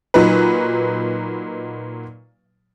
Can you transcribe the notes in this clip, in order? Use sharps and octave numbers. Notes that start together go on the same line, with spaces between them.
A#2 F#3 D#4 B4